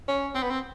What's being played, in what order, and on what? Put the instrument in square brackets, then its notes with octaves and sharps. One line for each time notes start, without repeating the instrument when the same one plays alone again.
[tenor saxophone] C#4
C4
B3
C4